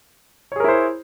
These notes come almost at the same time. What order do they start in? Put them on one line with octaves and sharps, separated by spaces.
C#5 G#4 A#4 E4 C5